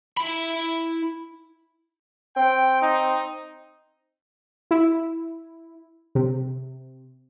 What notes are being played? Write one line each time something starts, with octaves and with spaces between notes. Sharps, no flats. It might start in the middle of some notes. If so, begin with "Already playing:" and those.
E4 B5
C4 G5
D#4
E4
C3